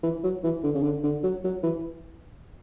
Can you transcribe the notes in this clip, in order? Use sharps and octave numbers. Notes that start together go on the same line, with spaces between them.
E3
F#3
E3
D3
C#3
D3
D3
F#3
F#3
E3